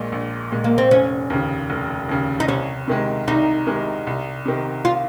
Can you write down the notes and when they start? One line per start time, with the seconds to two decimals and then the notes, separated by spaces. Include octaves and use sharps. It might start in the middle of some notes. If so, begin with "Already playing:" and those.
Already playing: A#1 A#2 G#3
0.12 A#1
0.52 A#2 G#3
0.64 A#3
0.78 C4
0.91 F1 C#4
1.30 D#2 C#3
1.70 F1
2.09 D#2 C#3
2.40 D#4
2.48 C2 C#4
2.88 C3 D#3 G#3
3.28 C2 D#4
3.67 C3 D#3 G#3
4.07 C2
4.46 C3 D#3
4.85 F4